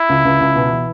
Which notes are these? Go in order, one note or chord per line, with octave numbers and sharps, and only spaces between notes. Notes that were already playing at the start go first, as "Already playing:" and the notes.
Already playing: E4
C#2
C#2
C#2
B2
E3